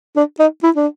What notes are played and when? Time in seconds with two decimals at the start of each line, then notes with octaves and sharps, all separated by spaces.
0.16 D4
0.39 D#4
0.63 E4
0.76 D4